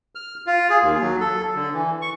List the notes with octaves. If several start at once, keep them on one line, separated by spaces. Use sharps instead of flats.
F6
F4
G#4
D#2
F#3
A4
D3
E3
C#6